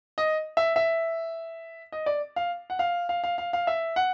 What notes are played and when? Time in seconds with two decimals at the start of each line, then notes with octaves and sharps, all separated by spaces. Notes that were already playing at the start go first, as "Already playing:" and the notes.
0.18 D#5
0.57 E5
0.76 E5
1.92 D#5
2.06 D5
2.36 F5
2.70 F#5
2.79 F5
3.09 F5
3.24 F5
3.38 F5
3.53 F5
3.67 E5
3.96 F#5